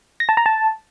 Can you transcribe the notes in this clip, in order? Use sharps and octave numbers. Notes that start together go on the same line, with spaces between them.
A#6
A5
A#5
A5